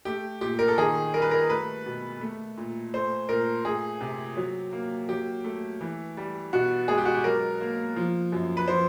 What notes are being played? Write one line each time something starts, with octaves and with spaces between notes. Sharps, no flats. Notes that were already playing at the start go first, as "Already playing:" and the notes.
A3 G4
A#2 G4
A#4
A4
D#3 G#4
G3 A#4
B4
A#4
A3 B4
B2
A3
A#2
A3 C5
A#2 A#4
A3 G#4
C3
F#3
A#3
F#3 G4
A3
E3
G3
B2 F#4
G#3 G#4
G4
F#4
G4
F#3 A#4
A#3
F3
F#2
B4
F3 C5